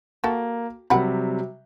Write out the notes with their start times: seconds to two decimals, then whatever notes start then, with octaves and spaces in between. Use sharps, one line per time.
0.24 A#3 F#4 G4 A4
0.90 C3 F#3 G3 A#4 F#5 B5